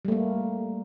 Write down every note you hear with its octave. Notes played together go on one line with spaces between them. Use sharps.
G3 A3 A#3